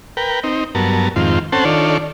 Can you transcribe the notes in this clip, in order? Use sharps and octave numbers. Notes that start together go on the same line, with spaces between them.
A#4 B4 G5
C4 D#4
G2 F#3 B3 A#4 A5
F2 G#2 D#3 C4 F4
C4 C#4 A4 C5 F#5 A5
D#3 D4 F4 A4 C#5 D5